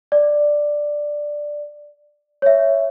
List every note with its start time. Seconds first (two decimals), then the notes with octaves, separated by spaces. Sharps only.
0.12 D5
2.42 C#5 E5